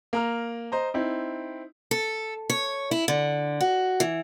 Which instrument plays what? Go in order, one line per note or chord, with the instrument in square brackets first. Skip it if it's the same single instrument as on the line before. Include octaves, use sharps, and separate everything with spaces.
[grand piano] A#3 A#5 F6
C5 D#5 A#5
C4 D#4 E4
[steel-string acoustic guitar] A4
C#5
E4
D3
F#4
E3